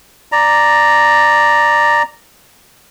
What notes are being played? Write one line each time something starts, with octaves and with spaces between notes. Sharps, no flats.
D5 A#5